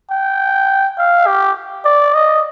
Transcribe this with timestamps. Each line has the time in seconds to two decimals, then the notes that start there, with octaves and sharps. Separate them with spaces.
0.11 G5
0.98 F5
1.27 G4
1.85 D5
2.14 D#5